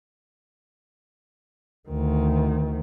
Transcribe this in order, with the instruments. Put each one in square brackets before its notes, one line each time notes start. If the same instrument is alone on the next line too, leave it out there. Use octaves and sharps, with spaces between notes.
[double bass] D2 D#3